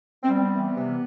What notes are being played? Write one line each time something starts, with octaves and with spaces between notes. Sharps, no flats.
C4
G3 B3
E3
C3